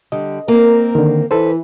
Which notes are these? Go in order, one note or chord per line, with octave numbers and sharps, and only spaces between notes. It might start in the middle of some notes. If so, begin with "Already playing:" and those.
D3 G3 D#5
A#3 C4 A#4
D3 D#3
E3 A4 B4 C5